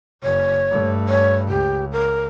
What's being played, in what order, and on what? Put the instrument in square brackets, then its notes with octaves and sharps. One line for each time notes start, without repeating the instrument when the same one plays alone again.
[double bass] F#1 [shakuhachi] C#5
[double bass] G2 A3
[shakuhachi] C#5
[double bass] C#2 [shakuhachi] G4
[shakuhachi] A#4